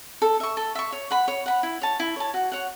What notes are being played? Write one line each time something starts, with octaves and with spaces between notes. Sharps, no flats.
A4
E5 C#6
A4
E5 C#6
C#5
F#5 B5
C#5
F#5 B5
E4
C#5 A5
E4
C#5 A5
F#4
C#5 F#5